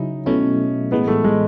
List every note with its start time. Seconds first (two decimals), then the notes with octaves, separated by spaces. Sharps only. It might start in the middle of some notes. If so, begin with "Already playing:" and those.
Already playing: C#3 F#3 C#4 D#4 E4
0.26 B2 F#3 A3 C#4 E4
0.91 A2 E3 G#3 B3
1.08 A3
1.24 G#3